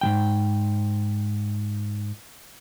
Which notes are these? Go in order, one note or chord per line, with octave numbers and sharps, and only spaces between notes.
G#2 F3 G5